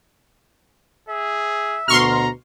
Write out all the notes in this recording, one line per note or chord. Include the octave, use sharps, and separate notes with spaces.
G#4 E5
D2 B2 A#5 C6 C#6 F6